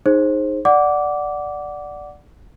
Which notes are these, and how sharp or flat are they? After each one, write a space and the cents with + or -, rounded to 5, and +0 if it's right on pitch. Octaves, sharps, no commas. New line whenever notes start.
D#4 -10 G#4 +0 C5 +25
D5 +0 F#5 +0 D6 -15